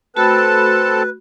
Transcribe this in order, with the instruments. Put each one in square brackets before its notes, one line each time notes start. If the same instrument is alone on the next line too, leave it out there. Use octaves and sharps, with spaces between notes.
[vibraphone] A3 F#4 B5 [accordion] C4 A4 A5 [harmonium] B4